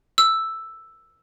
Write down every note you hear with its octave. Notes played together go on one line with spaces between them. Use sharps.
E6